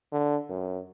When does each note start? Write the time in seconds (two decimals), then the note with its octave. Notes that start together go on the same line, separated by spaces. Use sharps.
0.12 D3
0.50 F#2